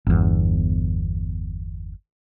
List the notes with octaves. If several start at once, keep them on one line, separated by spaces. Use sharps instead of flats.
G1 E2